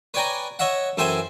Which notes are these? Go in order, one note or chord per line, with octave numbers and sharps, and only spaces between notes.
B4 C#5 D5 G5 G#5 A#5
C#5 D#5 E5 F#5
F#2 E3 A4 C5 G5 G#5